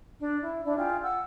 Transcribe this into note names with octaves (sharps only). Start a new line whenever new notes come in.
D4
E4
D4 E4 D5
F4 G#4 E5 G5
F#5 E6